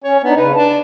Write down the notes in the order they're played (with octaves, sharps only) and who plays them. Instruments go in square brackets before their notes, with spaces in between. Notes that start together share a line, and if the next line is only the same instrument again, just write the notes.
[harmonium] C#4 [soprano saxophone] C#5
[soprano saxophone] B3 [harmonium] D4 D#4
[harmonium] C#3 B4 [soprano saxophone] D#4
[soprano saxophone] D4 [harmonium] A5